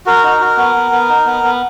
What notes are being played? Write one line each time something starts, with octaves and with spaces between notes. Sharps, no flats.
F#4 A#4
D#4
F#4
B3
B3
B3
D#4
B3
B3